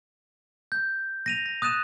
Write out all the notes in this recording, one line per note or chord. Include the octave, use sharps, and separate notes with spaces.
G6
A#6 D#7 F7
A#6
D#6 F#6 A6 D#7 E7